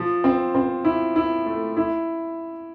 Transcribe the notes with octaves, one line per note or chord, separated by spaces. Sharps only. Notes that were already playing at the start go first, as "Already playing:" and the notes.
Already playing: F3
C4
C4
E4
E4
A3
E4